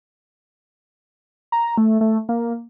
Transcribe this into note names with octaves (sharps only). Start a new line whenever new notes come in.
A#5
A3
A3
A#3